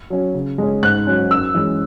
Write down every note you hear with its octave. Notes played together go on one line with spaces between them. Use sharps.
F#3 C#4
C#3
G#3 C#4
G#2 F#6
F#3 C#4
F#2 E6
E3 G#3 C#4